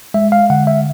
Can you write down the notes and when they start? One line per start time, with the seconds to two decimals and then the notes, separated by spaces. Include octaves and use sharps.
0.14 G#3 E5
0.32 F5
0.50 D3 F#5
0.67 E5